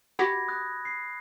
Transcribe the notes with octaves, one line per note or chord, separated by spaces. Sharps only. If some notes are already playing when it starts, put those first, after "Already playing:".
F#4 G4 F#5 B5 G#6 A#6
D#6 F#6 A6
C7